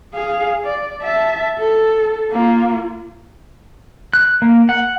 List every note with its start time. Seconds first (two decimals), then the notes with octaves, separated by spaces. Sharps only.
0.14 G#4 F5
0.64 D5
1.03 E5 A5
1.59 A4
2.31 A#3 F4
4.13 F#6
4.42 A#3
4.69 F#5